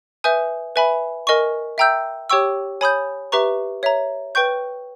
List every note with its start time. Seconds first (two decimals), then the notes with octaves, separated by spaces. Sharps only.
0.24 B4 E5 G#5 D#6 G6
0.76 B4 E5 G#5 B5
1.27 A#4 D#5 G#5 C#6
1.78 E5 G5 A#5 E6 G6
2.30 G4 C#5 G5 C#6 E6
2.81 C#5 G#5 B5 D#6 G6
3.32 G4 B4 E5 A#5 C#6
3.83 C#5 E5 A#5
4.35 B4 G5 C#6 G6